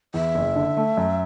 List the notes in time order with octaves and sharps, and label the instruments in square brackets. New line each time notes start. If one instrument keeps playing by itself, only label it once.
[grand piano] E2 [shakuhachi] E5
[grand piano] F#1
D3
A3
F#2